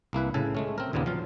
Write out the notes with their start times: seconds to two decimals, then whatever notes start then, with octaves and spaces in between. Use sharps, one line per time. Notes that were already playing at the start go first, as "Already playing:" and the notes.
0.13 C2 A#3 E4 B4
0.34 A2 C#3 A4 G#5
0.55 G#3 A3 C#4
0.78 C4 A#4
0.93 D#2 A#2 C#3 A#3 B3
1.06 F3 F#3 F4